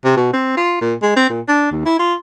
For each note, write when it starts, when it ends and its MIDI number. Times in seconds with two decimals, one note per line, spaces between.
0.04 0.16 48
0.17 0.28 47
0.33 0.55 60
0.57 0.79 65
0.81 0.94 46
1.02 1.12 56
1.16 1.27 60
1.30 1.41 46
1.48 1.68 62
1.71 1.82 39
1.85 1.99 64
1.99 2.15 65